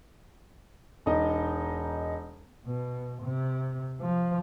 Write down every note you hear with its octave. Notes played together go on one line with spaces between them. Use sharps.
E1 D#4 D#5
B2
C3
F3